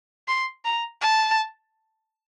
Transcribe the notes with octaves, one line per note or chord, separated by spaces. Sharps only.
C6
A#5
A5